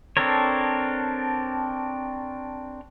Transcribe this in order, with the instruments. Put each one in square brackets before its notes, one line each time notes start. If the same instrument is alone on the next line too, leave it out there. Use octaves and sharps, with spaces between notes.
[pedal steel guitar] C4 D4 A4 A#4 C#5